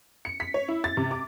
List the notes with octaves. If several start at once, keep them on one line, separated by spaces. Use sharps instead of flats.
C#7
B6
C#5
E4
A6
C3
D6